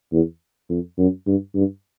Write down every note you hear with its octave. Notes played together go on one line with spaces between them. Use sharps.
E2
F2
F#2
G2
G2